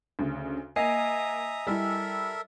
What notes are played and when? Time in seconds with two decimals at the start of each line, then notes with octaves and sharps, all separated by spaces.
0.19 D2 C#3
0.76 A#3 D#5 E5 G#5 A#5 D#6 C7
1.67 G3 E4 A4 A#4 E5